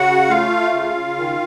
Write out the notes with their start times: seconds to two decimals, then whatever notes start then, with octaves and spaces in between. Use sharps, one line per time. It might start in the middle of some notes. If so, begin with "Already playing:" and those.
Already playing: C#3 F#4 F#5
0.30 A3 F4 F5
0.74 C#3
1.18 D#3